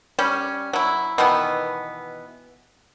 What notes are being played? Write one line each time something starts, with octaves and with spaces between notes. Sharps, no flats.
G3 C#4
F#3 E4
B2 D#3 E3 B3